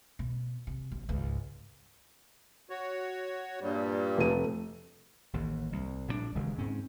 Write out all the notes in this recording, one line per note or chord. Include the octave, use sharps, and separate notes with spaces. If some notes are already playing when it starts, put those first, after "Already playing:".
B2
C3
A1
C#2 G#2
F#4 C#5
G2 A#2 G3
F1 A3 D#7
A1 D#2
C2
A#1 A2 D3 D4
E1 D#2 C#3 G#3
G#2 C4 C#4